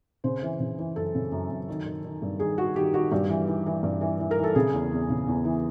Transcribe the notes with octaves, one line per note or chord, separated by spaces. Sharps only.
C#3 C5
E3
C#3
E3
F#2 A4
C#3
F#2
F#2
D#3
D#3
D#3
G2
D#3 G#4
D#3 F#4
D#3 G4
D#3 F#4
G2 G4
E3
E3
E3
G2
E3
E3
A#4
E3
A4
C#3 G#4
E2
E2
C#3
E2
E3